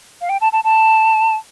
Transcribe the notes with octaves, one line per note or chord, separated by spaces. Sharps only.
F5
G5
A5
A5
A5